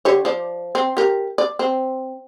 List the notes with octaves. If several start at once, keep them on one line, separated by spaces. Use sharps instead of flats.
D3 G4 C#5
F3 D5
C4
G4 A#4
D5
C4